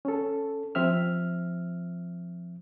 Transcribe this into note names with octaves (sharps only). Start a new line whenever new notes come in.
C#4 A4
F3 C4 E5 F6